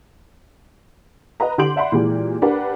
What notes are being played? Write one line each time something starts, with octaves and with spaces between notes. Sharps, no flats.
B4 D#5 A#5
D3 G4 C6 G6 D7 F#7
D5 E5 F#5 B5 C6
A#2 E3 G#3 G4
D4 G4 A#4 B4 F#5